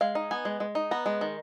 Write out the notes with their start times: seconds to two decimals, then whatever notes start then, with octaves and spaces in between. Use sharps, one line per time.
0.01 G#3 F5
0.15 D#4
0.31 B3 G#5
0.45 G#3
0.60 G#3
0.75 D#4
0.91 B3 A#5
1.06 G#3
1.21 D#3